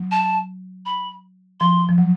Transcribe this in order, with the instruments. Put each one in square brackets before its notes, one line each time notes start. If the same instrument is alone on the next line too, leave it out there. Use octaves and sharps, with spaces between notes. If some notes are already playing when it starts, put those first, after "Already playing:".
Already playing: [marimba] F#3
[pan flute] A5
B5
[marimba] F3 [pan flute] C6
[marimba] F3
F#3